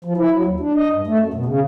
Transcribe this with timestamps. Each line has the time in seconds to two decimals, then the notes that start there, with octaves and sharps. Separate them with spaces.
0.05 F3
0.17 E4
0.32 F#3
0.45 D#2
0.60 D4
0.76 D#5
0.92 G2
1.07 A3
1.19 F#2
1.34 B2
1.46 C#3